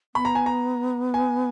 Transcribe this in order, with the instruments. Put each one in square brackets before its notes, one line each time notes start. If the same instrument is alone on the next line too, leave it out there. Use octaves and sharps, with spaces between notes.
[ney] B3 [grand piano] B5
[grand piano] A#5
G#5
A#5
G#5